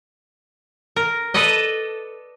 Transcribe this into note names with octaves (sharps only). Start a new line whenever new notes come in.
A#4
A4 B4 D5 D#5